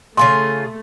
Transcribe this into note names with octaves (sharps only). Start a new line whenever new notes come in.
C#3 A3 F4 G#4 C6